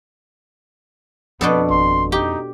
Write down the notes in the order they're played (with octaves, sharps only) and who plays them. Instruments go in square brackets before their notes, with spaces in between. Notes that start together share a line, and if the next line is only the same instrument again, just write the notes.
[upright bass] F2 [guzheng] B2 D4 A4 [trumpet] B3
[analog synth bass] G#1 [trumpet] C6
[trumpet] D#4 [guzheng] G4